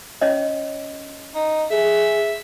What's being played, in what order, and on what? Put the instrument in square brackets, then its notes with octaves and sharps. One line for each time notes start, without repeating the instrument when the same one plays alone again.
[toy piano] C#4 C#5 D#5
[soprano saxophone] D#4
[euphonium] G#4 [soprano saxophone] E5